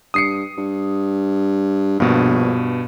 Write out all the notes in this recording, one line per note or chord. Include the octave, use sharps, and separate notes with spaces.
G2 D#6 C7 C#7
G2
A#1 G2 B2